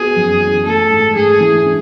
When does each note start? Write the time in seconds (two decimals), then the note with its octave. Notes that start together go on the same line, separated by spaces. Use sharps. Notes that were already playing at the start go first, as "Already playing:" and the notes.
Already playing: B3 F#4 G#4
0.16 F#2
0.42 E3
0.66 A3 A4
0.91 G#2
1.16 G#2 G#4
1.40 E3
1.65 D4